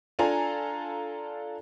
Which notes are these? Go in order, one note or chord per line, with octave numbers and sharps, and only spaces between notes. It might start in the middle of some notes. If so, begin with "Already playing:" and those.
D4 F4 A4 G#5 A#5